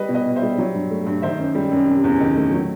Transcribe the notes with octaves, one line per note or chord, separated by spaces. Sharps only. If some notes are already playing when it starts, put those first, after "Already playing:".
Already playing: G3 B4 D#5
B2
B4 D#5
B2
C5 E5
G3
F#3
G2
A3
G2
D#3 C5 E5
F#2
G3
F#2
C3
E2
D#3
A3
F#3